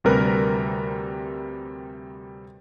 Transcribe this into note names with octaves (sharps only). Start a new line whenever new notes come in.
D2 C3 G3 A#4 B4